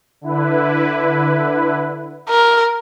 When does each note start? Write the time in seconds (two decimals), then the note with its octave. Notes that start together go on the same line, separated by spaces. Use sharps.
0.21 D3 E4 B4
2.29 A#4